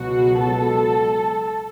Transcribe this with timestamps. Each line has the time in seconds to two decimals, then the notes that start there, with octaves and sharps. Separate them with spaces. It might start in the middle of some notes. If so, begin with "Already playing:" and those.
Already playing: C#2 B2 F#3 F#4
0.39 A4